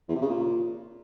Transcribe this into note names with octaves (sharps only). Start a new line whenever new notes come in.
E2
C3
C#3
A#2